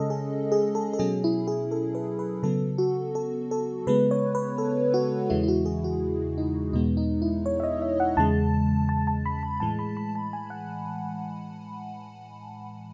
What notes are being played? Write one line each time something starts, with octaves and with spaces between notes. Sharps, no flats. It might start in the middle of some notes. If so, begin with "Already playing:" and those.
Already playing: C#3 G#3 C#4 A4 D#5
G#4
G#4
A4
A4
B2 F#3 C#4 G#4
E4
G#4
A4
B4
B4
C#3 F#3 B3 A4
F#4
A4
A4
C#3 G#3 B3 B4
C#5
B4
A4
F#4
E2 C#3 E3 G#3 E4
E4
F#4
G#4
F#4
D#4
E2 B2 G#3 B3 D#4
D#4
E4
C#5
E5
D#5
E5
F#5
E2 C#3 G#3 A5
A5
A5
B5
A5
A2 E3 G#3 A5
B5
B5
A5
G#5
F#5